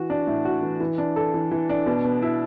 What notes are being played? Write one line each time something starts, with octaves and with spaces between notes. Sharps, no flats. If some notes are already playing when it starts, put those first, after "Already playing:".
Already playing: E3 F#4
D4
A2
F#4
E3
E3
D4
A4
E3
E3
D4
B2
B3
E4